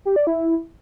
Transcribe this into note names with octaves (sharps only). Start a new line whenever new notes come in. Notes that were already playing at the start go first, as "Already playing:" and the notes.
G4
D5
E4